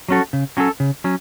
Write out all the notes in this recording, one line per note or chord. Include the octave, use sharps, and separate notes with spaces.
F#3 C#4 F#4 A4
C#3
F#3 C#4 F#4 A4
C#3
F#3 C#4